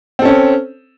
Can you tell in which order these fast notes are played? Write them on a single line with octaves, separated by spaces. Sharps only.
C4 A4 C#4